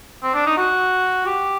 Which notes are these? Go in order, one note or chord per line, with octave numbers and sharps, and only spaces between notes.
C4
D4
D#4
F#4
G4